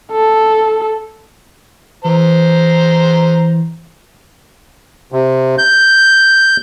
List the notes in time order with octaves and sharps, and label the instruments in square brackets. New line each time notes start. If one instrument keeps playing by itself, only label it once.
[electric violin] A4
[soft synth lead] E3 [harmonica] C5 A#5
[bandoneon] C3
G6